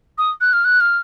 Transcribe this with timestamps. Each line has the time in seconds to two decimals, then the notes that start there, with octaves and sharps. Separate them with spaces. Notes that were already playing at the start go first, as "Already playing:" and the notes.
0.18 D#6
0.41 F#6
0.53 F6
0.65 F#6
0.80 F6